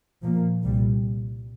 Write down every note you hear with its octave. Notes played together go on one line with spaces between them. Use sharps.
A#2 F3 A#3
C2 A#2 G3